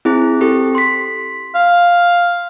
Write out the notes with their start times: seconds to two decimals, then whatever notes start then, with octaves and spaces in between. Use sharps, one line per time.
0.05 C4 E4 G#4
0.41 C4 G4 A4
0.75 C6 B6
1.55 F5